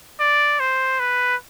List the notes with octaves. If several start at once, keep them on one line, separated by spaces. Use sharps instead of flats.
D5
C5
B4